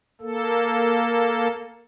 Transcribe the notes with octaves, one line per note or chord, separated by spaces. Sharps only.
A#3 A4